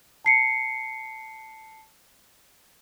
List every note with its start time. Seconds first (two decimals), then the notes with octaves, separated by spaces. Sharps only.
0.25 A5 C7 C#7